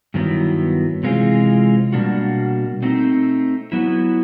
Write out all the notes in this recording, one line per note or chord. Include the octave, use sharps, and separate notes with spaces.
G2 D#3 F#3 B3 E4
C3 E3 G#3 C4 F4
B2 G3 A#3 D4 F#4
A3 C4 D#4
F#3 B3 E4